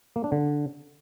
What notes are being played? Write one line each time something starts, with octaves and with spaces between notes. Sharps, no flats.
A#3
D4
D3